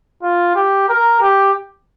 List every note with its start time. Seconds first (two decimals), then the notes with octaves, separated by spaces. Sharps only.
0.22 F4
0.55 G4
0.89 A#4
1.21 G4